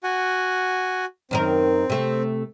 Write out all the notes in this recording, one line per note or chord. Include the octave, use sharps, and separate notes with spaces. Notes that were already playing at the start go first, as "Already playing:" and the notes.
F#4 F#5 G#5
F#2 D#3 C4 A#4
C3 A3